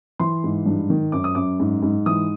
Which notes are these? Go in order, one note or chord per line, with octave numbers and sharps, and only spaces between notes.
E3 C6
G#2
G2
D#3
F#2 D6
D#6
F#2 D6
G#2
G#2
E3 D#6